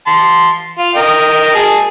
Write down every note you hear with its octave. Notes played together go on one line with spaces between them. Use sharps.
A5 C6
F4
A#4 D#5 G5
G#4 A5